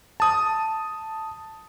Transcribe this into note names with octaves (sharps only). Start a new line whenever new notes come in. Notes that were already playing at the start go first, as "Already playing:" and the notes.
A5 D#6